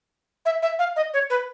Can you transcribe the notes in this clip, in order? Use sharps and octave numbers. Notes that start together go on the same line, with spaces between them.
E5
E5
F5
D#5
C#5
B4